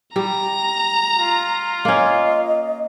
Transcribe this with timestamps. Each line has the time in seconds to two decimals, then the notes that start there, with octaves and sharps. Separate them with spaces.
0.16 G3 A#5
1.16 F4
1.85 A#3 C#4 D#5